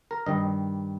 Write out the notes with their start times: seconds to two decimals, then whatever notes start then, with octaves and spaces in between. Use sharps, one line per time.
0.11 A#4
0.26 G2 D#3 G3 D#5